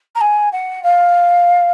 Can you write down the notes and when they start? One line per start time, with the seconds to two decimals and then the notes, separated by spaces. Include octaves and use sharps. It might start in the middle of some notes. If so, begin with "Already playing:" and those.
0.15 A#5
0.21 G#5
0.52 F#5
0.83 F5